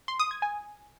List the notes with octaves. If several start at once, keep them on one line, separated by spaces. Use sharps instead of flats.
C6
D#6
G#6
G#5